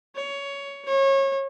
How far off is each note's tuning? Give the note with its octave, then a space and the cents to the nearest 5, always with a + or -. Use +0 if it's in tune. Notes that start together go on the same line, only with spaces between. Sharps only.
C#5 +15
C#5 -30